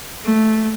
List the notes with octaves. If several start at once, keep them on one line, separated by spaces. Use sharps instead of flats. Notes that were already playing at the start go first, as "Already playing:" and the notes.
A3